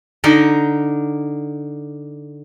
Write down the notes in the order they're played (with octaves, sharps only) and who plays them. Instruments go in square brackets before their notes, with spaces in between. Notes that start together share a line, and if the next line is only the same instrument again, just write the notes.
[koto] D3 D#4 A#4